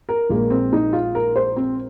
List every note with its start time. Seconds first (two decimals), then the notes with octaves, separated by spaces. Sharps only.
0.09 A#4
0.30 A#1 A#2 G#3 A#3
0.50 C4
0.73 D#4
0.93 F4
1.15 A#4
1.36 C5
1.56 C4